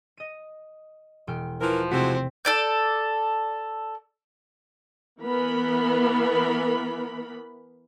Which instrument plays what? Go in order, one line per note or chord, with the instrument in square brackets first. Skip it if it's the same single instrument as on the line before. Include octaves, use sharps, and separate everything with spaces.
[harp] D#5 D#7
E1 G5 F6
[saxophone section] E3 A#4 [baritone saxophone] F3 [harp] E4
[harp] C3 A3 B6 [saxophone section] G#3 E4 F#4 [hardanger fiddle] C4
[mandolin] A4 D5 G6
[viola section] E3 B3 A#4 B5